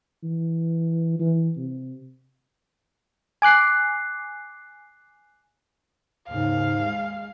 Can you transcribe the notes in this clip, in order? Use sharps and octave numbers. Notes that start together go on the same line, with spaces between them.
E3
E3
C3
G#5 D6 F#6 C7
D#2 G#2 C#3 F5
G#3